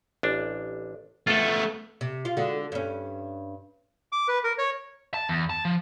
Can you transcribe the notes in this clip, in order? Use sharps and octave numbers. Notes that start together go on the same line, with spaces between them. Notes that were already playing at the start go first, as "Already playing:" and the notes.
A1 D4
A3 B3 F4 A4
C3
F4
D3 G#3 F#4
G2 C#4
D6
B4
A#4
C#5
A5
E2
A5
F3